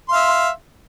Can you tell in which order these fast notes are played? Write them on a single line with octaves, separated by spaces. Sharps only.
C6 F5 E5